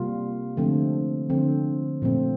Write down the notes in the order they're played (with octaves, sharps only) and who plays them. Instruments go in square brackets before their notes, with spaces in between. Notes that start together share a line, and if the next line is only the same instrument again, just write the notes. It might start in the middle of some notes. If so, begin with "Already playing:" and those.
Already playing: [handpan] C3 G3 A#3 F4
D3 F3 A3 C4
D3 F3 C4
A#2 F3 A3 C4